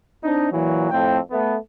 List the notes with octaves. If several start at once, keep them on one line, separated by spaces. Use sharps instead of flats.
C4 D4 D#4
A#2 E3 F#3
F2 A2 C4 G5
A3 B3